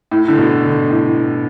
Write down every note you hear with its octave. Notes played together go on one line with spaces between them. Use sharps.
A2
D3
B2
D3
A2